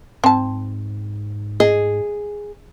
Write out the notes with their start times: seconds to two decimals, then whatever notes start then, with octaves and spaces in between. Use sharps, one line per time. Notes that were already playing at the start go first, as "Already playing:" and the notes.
0.24 G#2 C4 A5
1.60 G#4 D#5